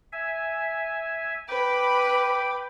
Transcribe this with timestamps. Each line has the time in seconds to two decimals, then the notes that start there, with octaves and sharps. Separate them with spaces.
0.12 E5 G#5
1.48 B4 G5 B5 D6